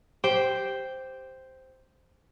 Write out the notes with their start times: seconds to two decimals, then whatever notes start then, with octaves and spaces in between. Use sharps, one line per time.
0.24 G4 C5 G5